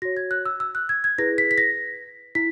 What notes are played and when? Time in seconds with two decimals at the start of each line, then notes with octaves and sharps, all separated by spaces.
0.02 F#4 A#6
0.05 C#5
0.17 G#6
0.31 F#6
0.46 E6
0.60 E6
0.75 F#6
0.89 G#6
1.04 G#6
1.18 E4 G#4 B4 A#6
1.38 B6
1.51 B6
1.58 A#6
2.35 E4 B6